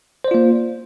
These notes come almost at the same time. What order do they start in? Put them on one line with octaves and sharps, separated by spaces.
C5 D5 F4 A#3